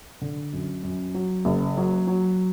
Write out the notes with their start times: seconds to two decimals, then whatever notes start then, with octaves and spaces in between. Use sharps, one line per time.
0.21 D3
0.53 F#2
0.83 F#2
1.14 F#3
1.45 F#1
1.77 F#3
2.07 F#3